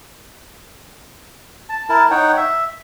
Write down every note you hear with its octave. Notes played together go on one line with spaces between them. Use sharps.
A5
E4 A#4 A5
D#4 C#5 F#5 G5
E5